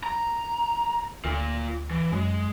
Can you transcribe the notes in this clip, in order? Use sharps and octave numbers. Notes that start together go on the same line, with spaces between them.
A#5
D2 F4 A#4
E3
F#2 G#3